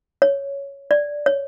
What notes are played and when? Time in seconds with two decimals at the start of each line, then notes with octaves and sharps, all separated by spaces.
0.22 C#5
0.91 D5
1.26 C#5